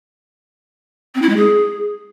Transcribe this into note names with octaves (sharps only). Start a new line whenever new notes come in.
C4
E4
G#3
G#4